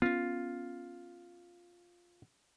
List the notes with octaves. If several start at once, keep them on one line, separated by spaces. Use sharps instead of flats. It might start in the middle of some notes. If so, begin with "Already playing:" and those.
B3 C#4 F4